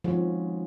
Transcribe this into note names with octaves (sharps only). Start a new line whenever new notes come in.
D#3 F3 G#3 C#4 F#4